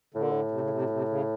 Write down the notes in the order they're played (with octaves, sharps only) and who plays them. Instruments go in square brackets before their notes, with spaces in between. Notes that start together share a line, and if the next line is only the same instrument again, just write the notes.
[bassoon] A2 [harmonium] D3
[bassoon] A#2
A2
[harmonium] C3
C#3
C3
B2
C3
C#3